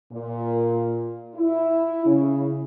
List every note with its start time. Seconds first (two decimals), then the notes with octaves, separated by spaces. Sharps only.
0.12 A#2
1.35 E4
2.06 C#3